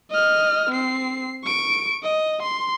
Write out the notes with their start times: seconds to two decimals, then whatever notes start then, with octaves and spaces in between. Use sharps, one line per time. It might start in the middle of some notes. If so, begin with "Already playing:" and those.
0.11 D#5 F6
0.70 C4 C7
1.45 C#6 D7
2.03 D#5
2.43 C6